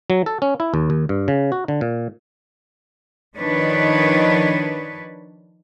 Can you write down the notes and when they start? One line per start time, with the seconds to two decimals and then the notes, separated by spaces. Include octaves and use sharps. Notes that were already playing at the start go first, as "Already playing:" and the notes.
0.10 F#3
0.26 A4
0.42 C#4
0.60 E4
0.74 D#2
0.90 D#2
1.09 G2
1.28 C#3
1.52 F#4
1.68 D3
1.81 A#2
3.37 D#3 F3 D4 B4 C#5 D#5